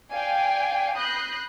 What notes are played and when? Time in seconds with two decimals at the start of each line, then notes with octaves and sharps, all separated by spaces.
0.11 D5 F5 G5 G#5 C7
0.95 B5 D#6 F#6 G6 A#6 C7